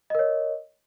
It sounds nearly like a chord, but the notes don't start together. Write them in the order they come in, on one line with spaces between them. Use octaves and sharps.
D#5 A#4 C#5